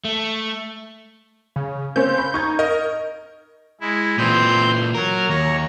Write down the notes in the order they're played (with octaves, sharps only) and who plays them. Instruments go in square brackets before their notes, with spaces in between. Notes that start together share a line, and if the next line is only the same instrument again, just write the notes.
[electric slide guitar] A3
[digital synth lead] C#3
[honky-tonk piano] A#3 C4 C#4 [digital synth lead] G6
[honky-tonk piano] B5
[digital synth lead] D#4 [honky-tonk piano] C#6 G6 G#6
[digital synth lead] A#4 [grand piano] D#5
[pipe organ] G#3 E4
[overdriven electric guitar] A#2 E3 [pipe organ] C4 C6 G6
[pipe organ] F#3 [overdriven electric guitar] A#4
[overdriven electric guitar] D#2 [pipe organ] C#5 A#5